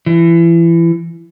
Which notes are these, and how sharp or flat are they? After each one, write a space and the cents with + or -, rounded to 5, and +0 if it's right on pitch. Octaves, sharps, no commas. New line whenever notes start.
E3 +25